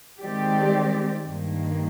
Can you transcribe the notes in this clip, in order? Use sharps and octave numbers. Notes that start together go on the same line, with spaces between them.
D#3 G#3 C4 G4 D5
G2 D#3 A#3